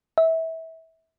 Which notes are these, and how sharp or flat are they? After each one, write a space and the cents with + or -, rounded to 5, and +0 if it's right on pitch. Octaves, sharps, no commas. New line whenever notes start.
E5 -25